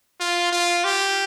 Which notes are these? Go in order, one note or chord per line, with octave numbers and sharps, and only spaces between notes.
F4
F4
G4